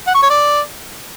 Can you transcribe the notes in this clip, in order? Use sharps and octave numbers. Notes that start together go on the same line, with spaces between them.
F#5
C#6
C#5
D5